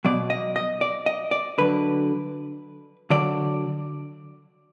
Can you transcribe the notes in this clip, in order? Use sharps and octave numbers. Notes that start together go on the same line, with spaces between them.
B2 F#3 D5
D#5
D#5
D5
D#5
D5
D3 F#3 B4
D3 F#3 D5